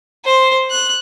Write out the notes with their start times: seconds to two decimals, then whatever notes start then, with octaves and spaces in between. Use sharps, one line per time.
0.24 C5
0.71 F#6